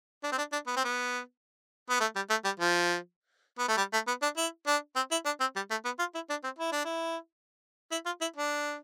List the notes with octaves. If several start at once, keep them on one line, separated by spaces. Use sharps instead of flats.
D4
C4
D4
D4
B3
C4
B3
B3
A3
G3
A3
G3
F3
B3
A3
G3
A3
B3
D4
E4
D4
C4
E4
D4
C4
G3
A3
B3
F4
E4
D4
C4
E4
D4
E4
E4
F4
E4
D4